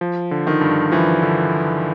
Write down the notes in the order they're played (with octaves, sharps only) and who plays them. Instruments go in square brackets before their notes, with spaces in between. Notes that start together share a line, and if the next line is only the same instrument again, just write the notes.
[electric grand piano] F3
D3
[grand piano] D#3
[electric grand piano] G2
[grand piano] E3 [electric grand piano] F3
[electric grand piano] D3